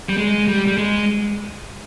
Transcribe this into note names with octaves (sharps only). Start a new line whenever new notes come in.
G3
G#3
G3
G3
G#3